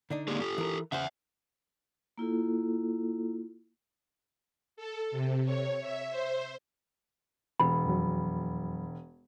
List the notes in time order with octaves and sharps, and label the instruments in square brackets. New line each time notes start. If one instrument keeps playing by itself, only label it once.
[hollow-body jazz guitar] D3 D4 D#4
[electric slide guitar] A#3 G4 G#4
G4 A4
[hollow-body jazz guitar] E3 A#4
[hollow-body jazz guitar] C#3 C5 [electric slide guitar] E5 F#5
[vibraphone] A#3 E4 F4 A4
[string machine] A4
C3
C#5
E5
C5
[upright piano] E1 [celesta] B5
[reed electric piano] F2 F#3